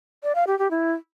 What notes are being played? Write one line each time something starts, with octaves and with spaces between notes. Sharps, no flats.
D5
F5
G4
G4
E4